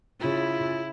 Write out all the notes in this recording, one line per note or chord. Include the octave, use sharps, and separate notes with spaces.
C#3 E4 F4